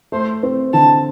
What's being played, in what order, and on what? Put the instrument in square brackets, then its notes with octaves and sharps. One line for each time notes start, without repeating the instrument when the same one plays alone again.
[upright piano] A3 [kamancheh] C5
[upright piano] C4
[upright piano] D3 [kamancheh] A5